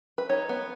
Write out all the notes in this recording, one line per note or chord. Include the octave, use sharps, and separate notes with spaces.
B4
D#4 C#5
B3